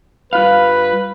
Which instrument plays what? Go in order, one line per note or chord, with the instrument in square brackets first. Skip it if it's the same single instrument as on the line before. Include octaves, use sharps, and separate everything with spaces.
[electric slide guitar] G2 F4 F5 [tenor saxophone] B4